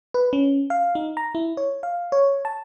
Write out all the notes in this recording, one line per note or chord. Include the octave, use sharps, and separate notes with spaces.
B4
C#4
F5
D#4
A#5
E4
C#5
F5
C#5
A5